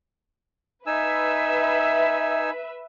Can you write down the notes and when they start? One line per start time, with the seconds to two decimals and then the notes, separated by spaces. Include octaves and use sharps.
0.87 D#4 B4 E5 G#5 E6